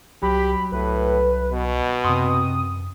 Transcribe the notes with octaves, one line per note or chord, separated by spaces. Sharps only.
C2 F#3 G4 B5
C2 A2 B4
B2
F#2 C3 C6 D#6